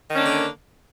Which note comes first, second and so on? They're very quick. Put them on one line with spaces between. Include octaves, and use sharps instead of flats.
D#3 C#4 D4 A#3 D3